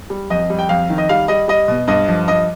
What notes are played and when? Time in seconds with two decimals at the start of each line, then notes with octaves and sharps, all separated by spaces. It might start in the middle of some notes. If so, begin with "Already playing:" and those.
0.10 G3
0.30 F2 D#5
0.50 G3
0.59 G5
0.69 F2 F5
0.90 D#3
0.98 D#5
1.09 G3 F5
1.28 G3 D#5
1.48 G3 D#5
1.68 B2
1.87 G2 D#5
2.08 F3
2.28 G2 D#5